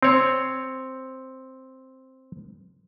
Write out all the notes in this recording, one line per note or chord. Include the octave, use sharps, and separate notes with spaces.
C4 C#5